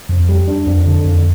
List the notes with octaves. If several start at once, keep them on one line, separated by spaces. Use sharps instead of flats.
F2
G3
D4
F2
D3
F2